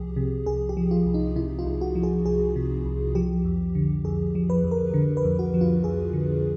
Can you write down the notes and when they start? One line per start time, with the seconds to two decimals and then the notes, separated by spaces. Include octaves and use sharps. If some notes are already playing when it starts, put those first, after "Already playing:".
Already playing: C2 F3 G4 G#4
0.16 C3
0.46 C2 G#4
0.69 G4
0.77 F3
0.91 F4
1.06 C2
1.14 D#4
1.36 C3 E4
1.59 F4
1.66 C2
1.81 F#4
1.95 F3
2.03 G#4
2.26 C2 G#4
2.56 C3
2.85 C2
3.15 F3 G4
3.45 F2
3.75 D3
4.04 F2 G#4
4.35 F3
4.50 B4
4.64 F2
4.71 A#4
4.94 D3
5.17 B4
5.25 F2
5.39 F#4
5.54 F3
5.61 F4
5.84 F2 G#4
6.13 D3